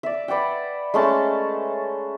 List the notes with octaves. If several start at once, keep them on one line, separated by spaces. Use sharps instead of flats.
D5 E5
B4 D5 F#5 G5
G#3 A3 C#4 A5